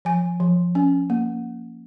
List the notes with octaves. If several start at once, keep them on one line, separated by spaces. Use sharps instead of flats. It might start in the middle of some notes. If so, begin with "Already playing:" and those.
F3 G#5
F3
C#4
A#3